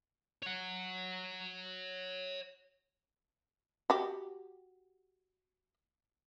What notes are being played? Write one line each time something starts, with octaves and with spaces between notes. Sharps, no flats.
C#5 F#5
F#4 G4